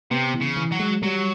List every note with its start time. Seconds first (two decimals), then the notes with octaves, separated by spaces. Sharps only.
0.11 C3 B3
0.34 E3
0.41 C#3
0.57 E3
0.72 F#3
0.80 G#3
1.02 F#3 G3